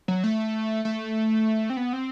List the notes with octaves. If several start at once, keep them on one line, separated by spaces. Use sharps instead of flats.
F#3
A3
A3
C4
B3
C4